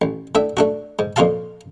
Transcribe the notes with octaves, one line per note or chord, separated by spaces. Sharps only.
A1
A2 D4 E5
A3 D4 F#4
G#2
F2 A#2 F4 F#4 F5 A5